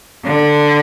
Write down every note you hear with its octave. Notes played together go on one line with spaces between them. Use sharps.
D3